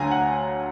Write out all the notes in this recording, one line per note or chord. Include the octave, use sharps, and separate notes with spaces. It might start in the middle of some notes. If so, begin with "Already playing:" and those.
Already playing: D2 D3 F#3 F5 G#5 A#5
F#5